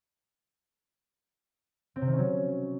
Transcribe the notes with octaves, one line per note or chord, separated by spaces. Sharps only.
C4
C3
D#3
C#4
F#3